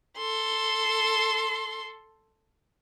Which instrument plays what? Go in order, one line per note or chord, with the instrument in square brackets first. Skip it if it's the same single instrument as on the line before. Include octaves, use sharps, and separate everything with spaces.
[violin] A4 C6